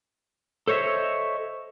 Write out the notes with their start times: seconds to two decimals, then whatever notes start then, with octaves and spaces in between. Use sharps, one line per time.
0.68 A4 C5 C#5 D#5 E5